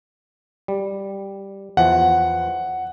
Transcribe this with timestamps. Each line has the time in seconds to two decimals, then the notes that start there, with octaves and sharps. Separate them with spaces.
0.68 G3
1.77 E2 E3 F3 F#5